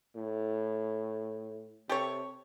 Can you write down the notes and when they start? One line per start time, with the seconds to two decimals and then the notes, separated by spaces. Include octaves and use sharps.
0.16 A2
1.89 C3 G4 A4 C#5